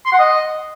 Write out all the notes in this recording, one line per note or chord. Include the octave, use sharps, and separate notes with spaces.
C6
F#5
D#5